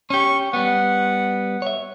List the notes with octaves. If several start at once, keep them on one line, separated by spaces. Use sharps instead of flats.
C#4 G4 C#6
G3 B3 F#5
C#5 E5